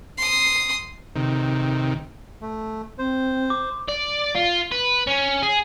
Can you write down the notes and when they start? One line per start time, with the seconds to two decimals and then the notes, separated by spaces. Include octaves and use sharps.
0.18 C6 D#6
1.16 C3 D#3
2.42 A3
2.99 C4 C5
3.50 D6
3.88 D5
4.35 F4
4.71 B4
5.07 C#4
5.43 G#4